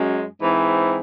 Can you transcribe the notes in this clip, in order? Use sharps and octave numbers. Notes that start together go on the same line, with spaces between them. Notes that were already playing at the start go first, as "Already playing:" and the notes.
Already playing: F#2 G#3
G#2 E3 C4